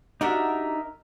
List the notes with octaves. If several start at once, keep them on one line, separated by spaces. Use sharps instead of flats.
D4 D#4 F#4 G4 A#4 E5